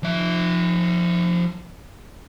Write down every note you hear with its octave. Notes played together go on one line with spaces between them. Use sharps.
F3 E5